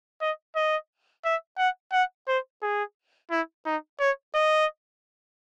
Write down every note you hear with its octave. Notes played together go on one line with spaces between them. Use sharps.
D#5
D#5
E5
F#5
F#5
C5
G#4
E4
D#4
C#5
D#5